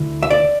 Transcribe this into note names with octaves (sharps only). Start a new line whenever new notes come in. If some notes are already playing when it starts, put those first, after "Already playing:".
Already playing: D2 D3 E4
E5
D5